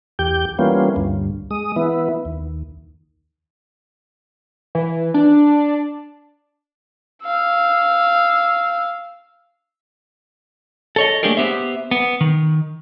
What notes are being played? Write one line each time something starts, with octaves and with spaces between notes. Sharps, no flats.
E2 G4 G6
E3 G3 A#3 B3 C#4 F4
D2 G2
G#3 D#6
E3 B3 E4
D#2
E3
D4
F5 E6
A4 C#5 D#5
A3 A#3 D4 G4 G#4 A#4
B3 G4 C5 E5
B3
D#3